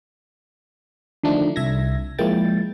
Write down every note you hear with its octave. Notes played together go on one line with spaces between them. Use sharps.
D3 D#3 F3 A3 D4 D#4
C2 E5 G#6 A#6
F3 G#3 A#3 E4 G5 A6